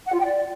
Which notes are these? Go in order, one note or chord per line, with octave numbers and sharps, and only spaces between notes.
F#5
F4
G5
D5